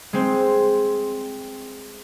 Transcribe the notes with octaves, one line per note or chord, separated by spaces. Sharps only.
G#3 C4